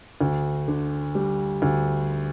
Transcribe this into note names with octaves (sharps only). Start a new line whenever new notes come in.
D2
D3
G3
D2